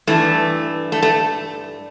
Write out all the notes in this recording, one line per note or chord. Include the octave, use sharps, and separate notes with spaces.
G2 E3 A3
A3
A3